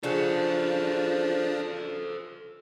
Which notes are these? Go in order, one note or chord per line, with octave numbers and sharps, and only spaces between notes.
C#3 F3 D4 F#4 A4 C5 A5